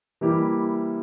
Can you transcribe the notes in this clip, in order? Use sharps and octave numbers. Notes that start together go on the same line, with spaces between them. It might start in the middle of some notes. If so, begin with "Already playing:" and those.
E3 G3 A#3 E4 G4